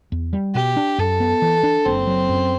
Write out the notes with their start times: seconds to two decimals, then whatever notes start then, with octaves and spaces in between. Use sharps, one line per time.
0.12 E2
0.33 G3
0.55 B2 G4
0.77 D4
0.98 F#2 A4
1.20 B3
1.42 E3
1.63 D4
1.85 F#1 C4
2.07 F#3
2.29 F#2